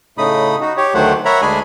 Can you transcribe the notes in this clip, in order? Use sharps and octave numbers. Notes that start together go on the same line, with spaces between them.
A2 C#3 A3 D#4 B5 D#6
D#4 F#4
G4 C#5
D2 D#3 F#3 A3 C5 F#5
A#4 C#5 E5 F#5 A#5 B5
D2 G#3 D4 G#4 G#5 B5